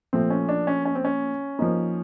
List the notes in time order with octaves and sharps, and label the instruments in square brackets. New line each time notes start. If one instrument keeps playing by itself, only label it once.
[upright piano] A#2 F3 A3 [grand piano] C4
[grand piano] C#4
D4
C#4
C#4
C4
C#4
[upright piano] F3 A#3 D#4